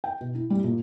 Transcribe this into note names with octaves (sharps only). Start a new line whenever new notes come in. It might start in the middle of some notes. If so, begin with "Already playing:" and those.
G5
B2
E4
G3
A#2